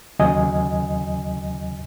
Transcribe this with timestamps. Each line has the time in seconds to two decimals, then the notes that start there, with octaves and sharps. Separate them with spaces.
0.19 D#2 C#3 F#3 D#5 G#5